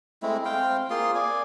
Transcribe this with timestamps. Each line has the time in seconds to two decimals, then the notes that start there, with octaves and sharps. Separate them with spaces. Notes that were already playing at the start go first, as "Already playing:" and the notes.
0.22 G#3 A3 C4 E4
0.45 C4 F5 G5
0.90 A#3 F4 G#4 C6
1.15 D5 G#5